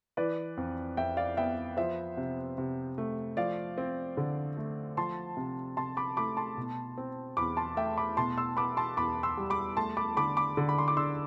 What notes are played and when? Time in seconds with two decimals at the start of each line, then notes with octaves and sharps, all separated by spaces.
0.17 E3 B4 D5
0.57 F2
0.97 F2 E5 G5
1.17 D5 F5
1.37 B3 E5 G5
1.77 F3 C5 E5
2.17 C3
2.58 C3
2.98 A3
3.37 F3 D5 F5
3.78 C4
4.17 D3
4.57 A3
4.97 F3 A5 C6
5.37 C3
5.77 C3 A5 C6
5.97 B5 D6
6.17 A3 B5 D6
6.37 A5 C6
6.57 B2
6.98 C4
7.37 E2 B5 D6
7.57 A5 C6
7.77 A3 E5 G5
7.97 B5 D6
8.17 B2 A5 C6
8.37 C6 E6
8.57 B3 B5 D6
8.77 A5 C6
8.97 E2 B5 D6
9.23 C6 E6
9.37 G3
9.50 B5 D6
9.77 A3 A5 C6
9.97 B5 D6
10.17 D3 B5 D6
10.37 B5 D6
10.57 D3
10.69 B5
10.78 C6
10.88 D6
10.97 D4 C6 E6